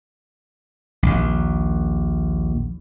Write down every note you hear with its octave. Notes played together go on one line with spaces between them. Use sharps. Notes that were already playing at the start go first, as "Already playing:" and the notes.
A#1 D#2